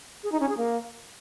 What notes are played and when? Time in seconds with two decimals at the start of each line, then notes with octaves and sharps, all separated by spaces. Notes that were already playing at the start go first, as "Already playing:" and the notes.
0.23 G#4
0.32 D#4
0.40 C#4
0.49 G#4
0.57 A#3